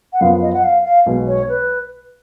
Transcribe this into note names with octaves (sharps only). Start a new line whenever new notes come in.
F#5
F#2 F3 B3 F4 F5
D#5
F#5
F5
F5
B1 B2 G#3
C#5
B4